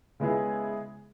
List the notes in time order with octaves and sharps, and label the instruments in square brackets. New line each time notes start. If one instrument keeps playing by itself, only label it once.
[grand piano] C#3 G#3 B3 E4 G#4